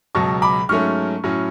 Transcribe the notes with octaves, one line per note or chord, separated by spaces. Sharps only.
C#2 B2 F#3 A5 C#6
B5 D6
G#2 F#3 A3 C#4 C#6 F6
A2 F#3 C#4